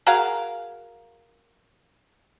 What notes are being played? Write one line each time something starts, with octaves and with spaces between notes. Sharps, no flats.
F#4 G#4 A#4 F5